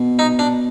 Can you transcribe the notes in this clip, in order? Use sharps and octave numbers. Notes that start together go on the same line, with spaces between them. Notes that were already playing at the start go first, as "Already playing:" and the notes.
Already playing: B2
D#4
D4